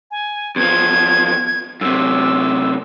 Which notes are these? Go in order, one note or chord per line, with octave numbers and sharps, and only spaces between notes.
G#5
E2 F3 G#6
F#2 C3 E6